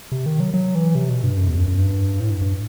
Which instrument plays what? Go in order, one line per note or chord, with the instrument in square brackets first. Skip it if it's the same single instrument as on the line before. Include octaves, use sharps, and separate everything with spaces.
[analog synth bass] C3
D#3
F#3
F#3
E3
C3
B2
G2
F#2
E2
F#2
F#2
G2
A2
G2
G2